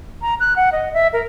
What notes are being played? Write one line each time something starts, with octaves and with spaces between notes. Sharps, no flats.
A#5
F#6
F#5
D#5
E5
A#4